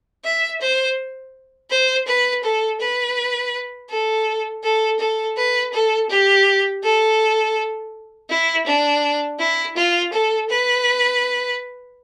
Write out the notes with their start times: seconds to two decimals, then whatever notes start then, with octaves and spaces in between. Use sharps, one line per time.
0.24 E5
0.61 C5
1.70 C5
2.07 B4
2.43 A4
2.80 B4
3.89 A4
4.63 A4
4.99 A4
5.37 B4
5.73 A4
6.10 G4
6.83 A4
8.29 E4
8.66 D4
9.39 E4
9.76 F4
10.13 A4
10.49 B4